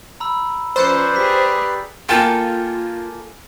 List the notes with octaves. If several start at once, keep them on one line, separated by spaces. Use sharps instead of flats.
A#5 B5 E6
F3 C#4 B4 C5 D5 E6 G6 C#7
G4 G#4 B6
A#3 F4 A4 F5 G5 G#5 E7